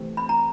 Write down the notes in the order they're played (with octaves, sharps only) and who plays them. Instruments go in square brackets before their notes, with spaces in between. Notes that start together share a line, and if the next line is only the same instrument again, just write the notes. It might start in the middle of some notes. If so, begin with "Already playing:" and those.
Already playing: [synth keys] C3 E3 A3 C4
[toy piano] B5
A#5